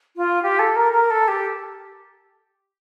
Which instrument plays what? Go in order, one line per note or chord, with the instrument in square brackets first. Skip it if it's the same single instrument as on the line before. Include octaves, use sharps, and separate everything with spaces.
[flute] F4
G4
A4
A#4
A#4
A4
G4